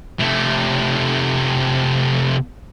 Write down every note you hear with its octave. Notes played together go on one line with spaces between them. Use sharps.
C3 A3